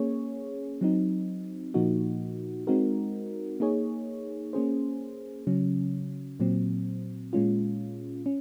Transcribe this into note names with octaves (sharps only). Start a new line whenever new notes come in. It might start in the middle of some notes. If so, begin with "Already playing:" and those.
Already playing: A#3 C#4 G#4 C#5
F#3 C4 D#4
A#2 F3 A#3 D#4 F#4
G#3 C4 D#4 F#4 A#4
A#3 D#4 G#4 C#5
A#3 C#4 G#4 C5
C#3 F#3 C#4
A#2 F#3 C4
A#2 G#3 C#4 F4
C#4